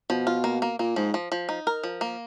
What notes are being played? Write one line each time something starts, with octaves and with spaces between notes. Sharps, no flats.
B2 F3
F4
A#3
A#3
A#2 A#3
G#2 F3
F3
F3
D#4
A#4
F3
A#3